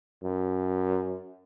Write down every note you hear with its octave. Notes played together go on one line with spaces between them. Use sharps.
F#2